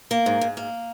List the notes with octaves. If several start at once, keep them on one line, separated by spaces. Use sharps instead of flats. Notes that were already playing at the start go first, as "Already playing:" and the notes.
A#3
G#2
G#2
A#3